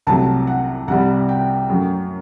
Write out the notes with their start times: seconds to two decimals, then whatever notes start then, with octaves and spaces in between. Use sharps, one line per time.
0.07 C2 C3 F#3 A3 A5
0.47 F#5
0.88 C2 C3 G3 F#5
1.29 G5
1.69 F#2 F#3 A3